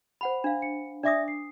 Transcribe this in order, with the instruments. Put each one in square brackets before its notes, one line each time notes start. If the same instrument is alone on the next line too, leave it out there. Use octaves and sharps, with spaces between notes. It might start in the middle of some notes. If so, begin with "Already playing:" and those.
[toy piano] C5 F#5 B5
D4 F5
[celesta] C#7
[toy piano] D4 D6 D#6 [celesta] D5 E5 A#6
[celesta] C7